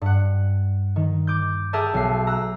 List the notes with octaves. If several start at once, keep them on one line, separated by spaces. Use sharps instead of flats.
G2 F#5
D#3
D6 G6
G4 G#4 A#4 E5 G5 A5
B1 C7
A#5 E6 F#6